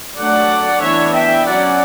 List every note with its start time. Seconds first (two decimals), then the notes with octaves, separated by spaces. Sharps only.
0.17 F#3 A3 D4 D5 F#5
0.82 E3 B3 D4 C#5 E5
1.14 E5 G5
1.46 F#3 C#4 D5 F#5